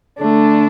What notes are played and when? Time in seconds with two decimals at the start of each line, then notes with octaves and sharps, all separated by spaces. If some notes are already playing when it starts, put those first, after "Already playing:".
0.19 D3 A3 D4